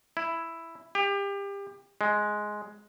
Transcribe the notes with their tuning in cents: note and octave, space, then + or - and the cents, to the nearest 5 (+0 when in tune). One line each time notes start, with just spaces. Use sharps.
E4 +5
G4 +30
G#3 +10